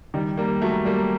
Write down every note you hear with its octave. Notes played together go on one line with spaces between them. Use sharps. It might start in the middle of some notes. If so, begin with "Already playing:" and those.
D#3 G3
G3 A#3
F#3 A3
G3 A#3